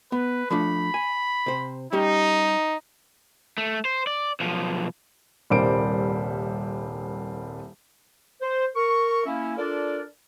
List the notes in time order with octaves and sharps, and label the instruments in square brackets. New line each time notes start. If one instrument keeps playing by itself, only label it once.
[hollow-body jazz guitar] B3 [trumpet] B4
[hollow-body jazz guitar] F3 A3 D4 [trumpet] B5
[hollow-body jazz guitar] G#5
C3 C5
[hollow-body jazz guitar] G3 C#4 G4 [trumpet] D#4
[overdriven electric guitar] A3
C5
D5
B1 F3
[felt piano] D#1 C2 G3 A#3 C5 D7
[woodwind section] C5
A#4 C#6
A#3 C#4 E4
D4 F4 A4 A#4 D5